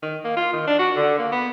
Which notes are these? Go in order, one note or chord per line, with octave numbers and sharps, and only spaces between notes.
D#3
A#3
F4
D#3
D4
F#4
D3
A#3
B3